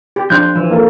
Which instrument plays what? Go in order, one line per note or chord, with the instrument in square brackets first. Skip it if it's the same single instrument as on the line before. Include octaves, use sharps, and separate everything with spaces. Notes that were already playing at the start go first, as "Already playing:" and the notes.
[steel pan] G4
[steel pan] F3 D4 [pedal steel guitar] C6 F#6 G6
[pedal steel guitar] E3 [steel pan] F3
[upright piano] A#3 F4 A4